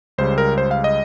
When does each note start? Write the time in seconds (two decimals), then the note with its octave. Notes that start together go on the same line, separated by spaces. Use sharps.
0.18 C#2 C#3 G3 C5
0.38 A#4
0.58 C5
0.71 F5
0.84 D#5